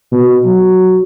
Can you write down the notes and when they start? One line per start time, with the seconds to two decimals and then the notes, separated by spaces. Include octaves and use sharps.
0.12 B2
0.45 F#3